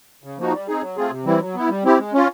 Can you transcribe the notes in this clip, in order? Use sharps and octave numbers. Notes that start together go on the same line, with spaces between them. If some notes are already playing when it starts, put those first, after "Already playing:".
C#3
F3 A#3 D#4 F#4
G3
C4 D#4 G#4
F#3
A3 C4 F4 G#4
C3
E3 G3 C4 E4
F#3
B3 E4
G3
C4 E4 G4
G#3
C#4 F4